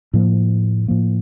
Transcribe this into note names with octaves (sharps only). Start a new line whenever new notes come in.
A2 F3 A#3
A2 F3 A#3